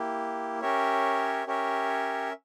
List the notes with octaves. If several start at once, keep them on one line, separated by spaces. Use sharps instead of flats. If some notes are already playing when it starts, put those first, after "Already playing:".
Already playing: A#3 E4 G4
C#4 G4 A#4 C#5 E5
C#4 G4 A#4 C#5 E5